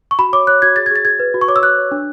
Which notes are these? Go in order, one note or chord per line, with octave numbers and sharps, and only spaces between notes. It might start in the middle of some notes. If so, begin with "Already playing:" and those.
C#6
F#4 B5
C#5 D6
C#5 F#6
F#4 G#6
G#4 A6
G#6
G#4 A6
G#4 G#6
B4
F#4
C#6
C#5 D6
E6
F#4 F#6
C#5
D4